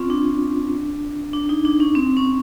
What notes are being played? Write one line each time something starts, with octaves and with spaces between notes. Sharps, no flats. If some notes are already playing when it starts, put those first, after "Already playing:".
Already playing: C4 C#4 F4
D4
D4
D#4
D4
C#4
C4
C#4